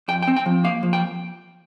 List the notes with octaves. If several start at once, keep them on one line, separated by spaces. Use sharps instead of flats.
F2 G5
G5
C4
G5
F3
A#3 F5
F3
G5